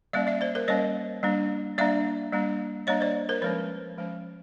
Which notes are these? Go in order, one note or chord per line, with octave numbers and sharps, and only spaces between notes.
G3 A#3 C#4 D5 E5
D5 E5
C5 D5
A#4 C5
G3 A#3 C#4 C#5 D#5
G3 A#3 D4
G3 A#3 D4 D5 E5
G3 A#3 D4
G3 A#3 D4 C#5 D#5
C5 D5
A#4 C5
F3 G#3 C#4 B4 C#5
F3 G#3 C#4